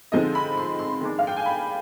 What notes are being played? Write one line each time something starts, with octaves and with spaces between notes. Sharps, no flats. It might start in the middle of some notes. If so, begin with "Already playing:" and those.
D3 F3 G#3 C4 D#4 D#5
B5
C6
C6
D#3 G#3 D4
F5
G5
G#5
B5